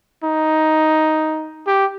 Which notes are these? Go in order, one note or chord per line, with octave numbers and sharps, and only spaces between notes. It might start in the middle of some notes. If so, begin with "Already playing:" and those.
D#4
G4